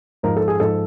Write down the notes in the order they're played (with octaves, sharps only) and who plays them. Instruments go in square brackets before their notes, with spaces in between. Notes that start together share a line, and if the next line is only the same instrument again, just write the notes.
[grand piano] G#2 F3 A#4
A4
G#4
G#2 F3 A4